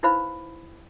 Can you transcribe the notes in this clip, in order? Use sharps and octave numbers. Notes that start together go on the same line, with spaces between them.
D#4 E4 B4 C5 F5 B5